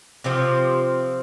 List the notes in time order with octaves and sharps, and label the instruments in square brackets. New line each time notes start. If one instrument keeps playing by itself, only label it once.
[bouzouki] C3 F3 C4 G4